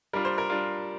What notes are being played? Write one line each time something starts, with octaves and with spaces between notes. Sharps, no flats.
G3 D4 F4 A#4
C5
A#4
G3 D4 F4